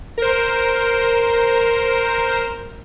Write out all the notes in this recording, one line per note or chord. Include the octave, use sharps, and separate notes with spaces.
A#4 C5